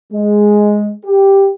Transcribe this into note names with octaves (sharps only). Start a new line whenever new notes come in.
G#3
G4